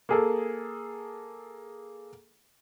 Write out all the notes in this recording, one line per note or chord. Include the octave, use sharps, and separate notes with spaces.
A#3 G#4 A4